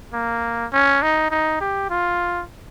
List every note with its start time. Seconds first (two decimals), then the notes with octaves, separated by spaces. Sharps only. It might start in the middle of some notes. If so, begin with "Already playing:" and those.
0.13 A#3
0.73 C#4
1.02 D#4
1.31 D#4
1.61 G4
1.90 F4